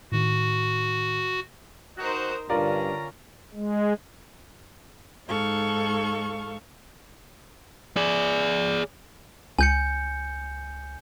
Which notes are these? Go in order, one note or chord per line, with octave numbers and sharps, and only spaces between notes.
A2 D#3 F#4
D#3 D#4 F#4 A#4 C5
G2 D3 C#4 F4 A#4 D5 A#5
G#3
G#2 D#4 A4 F5 C#6
G#4 D5
C#2 G#5 G6 C#7